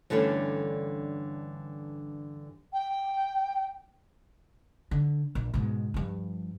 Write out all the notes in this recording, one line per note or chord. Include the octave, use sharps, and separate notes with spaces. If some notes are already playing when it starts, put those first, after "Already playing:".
G2 D3 E3 A3 C#4 D4
G5
D3
A#1
G#2 B2
G2 F3